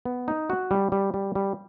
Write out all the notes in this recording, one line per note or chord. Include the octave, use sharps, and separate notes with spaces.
B3
D#4
F#4
G3
G3
G3
G3